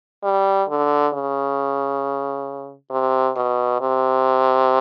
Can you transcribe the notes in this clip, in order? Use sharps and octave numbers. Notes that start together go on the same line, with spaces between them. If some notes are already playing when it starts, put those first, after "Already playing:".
G3
D3
C#3
C3
B2
C3